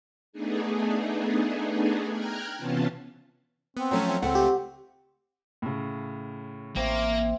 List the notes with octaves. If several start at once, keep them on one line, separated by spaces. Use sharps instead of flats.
A3 B3 D4 D#4 G#4
G5 A#5 F6 F#6 G#6
C3 E3 B3 C#4 F4 A5
B3 C4
F3 F#3 A3 C#4
C4
C#2 A3 C4 F#5
G4
A2 C#3
A1 A#3 C4 E5